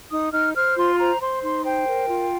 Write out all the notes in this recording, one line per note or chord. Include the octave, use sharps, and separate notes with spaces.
D#4 D#6
D#4 F6
C5 F6
F4 C6
C5 A#5
C5 C6
D#4 C6
C5 G5
A#4
F4